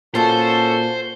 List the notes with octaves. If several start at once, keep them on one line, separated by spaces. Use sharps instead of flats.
A#2 C#4 F4 F#4 A4 C5 D5 A5